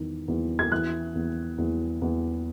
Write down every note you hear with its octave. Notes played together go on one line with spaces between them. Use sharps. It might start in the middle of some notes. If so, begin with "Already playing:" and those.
Already playing: E2 D#3
E2
G#6
E3 F#6
E2
E2
E2